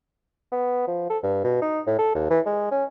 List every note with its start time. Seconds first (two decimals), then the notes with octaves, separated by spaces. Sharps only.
0.52 B3
0.88 F3
1.10 A4
1.23 G2
1.44 B2
1.62 D#4
1.87 A2
1.98 A4
2.15 D#2
2.30 E3
2.46 G#3
2.71 C#4